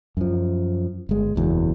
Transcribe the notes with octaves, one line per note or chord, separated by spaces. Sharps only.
F#2 F3
G1 G#3
F#1 E2 B2